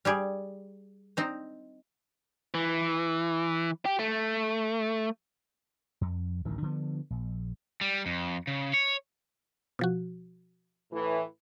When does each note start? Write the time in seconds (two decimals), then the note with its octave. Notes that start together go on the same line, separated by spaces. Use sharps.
0.05 G3 G4 G#4
1.17 C4 D#4 C5
2.54 E3
3.86 G4
3.99 A3
6.01 F2
6.45 D1 A1 D#3
6.62 D3 F3 B3
7.10 A#1
7.81 G3
8.06 F2
8.47 C#3
8.74 C#5
9.79 B2 F3 F#4
10.92 A2 E3